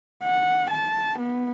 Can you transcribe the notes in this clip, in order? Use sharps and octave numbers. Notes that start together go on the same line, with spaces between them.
F#5
A5
B3